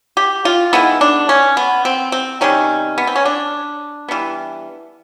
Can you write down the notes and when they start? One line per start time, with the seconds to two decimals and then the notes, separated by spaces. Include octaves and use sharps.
0.17 G4
0.45 F4
0.73 D#3 G#3 B3 E4
1.01 D4
1.29 C#4
1.57 B3
1.85 C4
2.12 C4
2.41 C3 D#3 G3 C#4
2.98 B3
3.07 C4
3.16 C#4
3.25 D4
4.08 E3 G3 B3